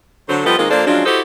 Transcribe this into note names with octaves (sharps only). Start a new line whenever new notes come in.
D3 F#3 C5
F3 G3 B3 F4 A4 D#5
D#3 G#3 A#3 C4 F4 D#5
F3 A#3 D4 F4 A4 C5
F3 F#3 G#3 C#4 D4 F4
E4 F#4 G4 A4 C5 D#5